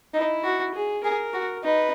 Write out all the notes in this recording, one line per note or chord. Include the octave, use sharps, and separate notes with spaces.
D#4 E4
F#4
G#4
G#4 A#4
F#4
D#4 B4